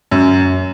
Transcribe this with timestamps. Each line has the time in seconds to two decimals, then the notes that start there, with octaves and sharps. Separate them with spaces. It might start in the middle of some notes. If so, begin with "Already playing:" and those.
0.11 F#2